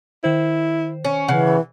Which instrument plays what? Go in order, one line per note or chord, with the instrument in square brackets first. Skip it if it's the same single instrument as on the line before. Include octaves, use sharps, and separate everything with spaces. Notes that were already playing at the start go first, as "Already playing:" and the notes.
[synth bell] D#3 C5 [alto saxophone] E4
[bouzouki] C#4
[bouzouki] C#3 [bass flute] E3 [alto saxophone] F#5